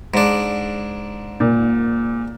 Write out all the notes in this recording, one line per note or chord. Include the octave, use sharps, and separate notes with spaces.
G#2 D4
A#2